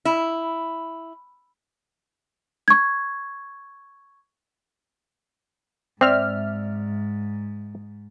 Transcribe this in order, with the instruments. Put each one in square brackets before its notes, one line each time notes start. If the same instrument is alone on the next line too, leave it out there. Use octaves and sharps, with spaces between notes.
[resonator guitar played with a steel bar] E4
[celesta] C#6 G#6
[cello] G#2 [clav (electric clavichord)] C4 [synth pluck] D5 E5 F6